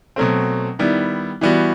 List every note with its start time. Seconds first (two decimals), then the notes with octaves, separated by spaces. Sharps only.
0.16 B2 F#3 A3 C4
0.79 D#3 G3 B3 E4
1.41 E3 G3 B3 F#4